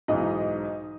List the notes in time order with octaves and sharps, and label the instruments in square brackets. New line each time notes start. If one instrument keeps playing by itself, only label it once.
[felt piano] B1 G#2 E3 [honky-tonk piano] D#4